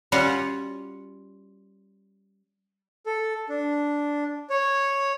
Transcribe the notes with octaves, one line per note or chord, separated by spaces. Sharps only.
G3 C#4 F4 F#4 C#5 F#5
A4
D4
C#5